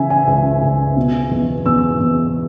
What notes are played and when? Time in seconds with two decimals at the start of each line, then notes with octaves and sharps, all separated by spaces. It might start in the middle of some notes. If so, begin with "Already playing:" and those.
Already playing: C#3 E3 E5 G#5
0.10 G#5
0.27 C#2 G#5
0.62 C#2
0.97 B2
1.31 E2
1.66 E2 E6
2.00 E2